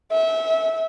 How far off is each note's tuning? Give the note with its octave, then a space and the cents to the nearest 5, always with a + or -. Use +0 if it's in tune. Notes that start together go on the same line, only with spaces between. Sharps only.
E5 -25